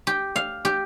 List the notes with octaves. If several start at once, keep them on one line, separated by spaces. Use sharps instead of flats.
G4
F5
G4